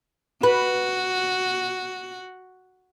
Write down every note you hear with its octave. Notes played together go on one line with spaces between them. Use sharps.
F#4 B4